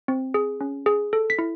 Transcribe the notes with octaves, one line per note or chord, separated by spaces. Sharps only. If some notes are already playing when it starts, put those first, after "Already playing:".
C4
G#4
C#4
G#4
A4
B6
E4